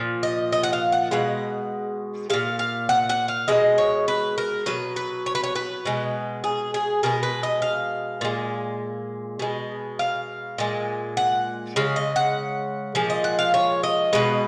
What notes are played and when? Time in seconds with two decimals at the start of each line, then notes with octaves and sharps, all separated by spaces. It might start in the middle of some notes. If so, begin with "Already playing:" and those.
Already playing: A#2 F3
0.23 D#5
0.52 D#5
0.63 F#5
0.73 F5
0.92 F#5
1.11 B2 G#3 F#5
2.30 A#2 G#3 F5
2.59 F5
2.89 F#5
3.09 F#5
3.28 F5
3.48 B2 G#3 D#5
3.78 C#5
4.08 B4
4.38 A#4
4.66 B2 F#3 B4
4.96 B4
5.26 C#5
5.35 B4
5.43 C#5
5.56 B4
5.86 B2 G#3
6.44 G#4
6.74 G#4
7.03 B2 G#3 A#4
7.23 B4
7.43 D#5
7.62 F5
8.21 A#2 G#3
9.39 B2 G#3
9.99 F5
10.58 A#2 G#3
11.17 F#5
11.76 C#3 G#3 F5
11.96 D#5
12.16 F#5
12.95 A#2 F3 G#3
13.10 D#5
13.24 F#5
13.39 F5
13.54 C#5
13.83 D#5
14.13 B2 G#3 B4